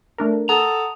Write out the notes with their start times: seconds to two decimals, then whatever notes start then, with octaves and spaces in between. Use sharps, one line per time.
0.18 A3 D4 A#4
0.49 A4 F#5 A5 A#5 D#6